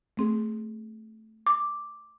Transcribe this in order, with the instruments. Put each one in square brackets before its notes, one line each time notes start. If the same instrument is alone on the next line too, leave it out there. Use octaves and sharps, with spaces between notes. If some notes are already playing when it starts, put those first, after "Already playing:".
[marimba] A3 C4 G#4
[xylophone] D6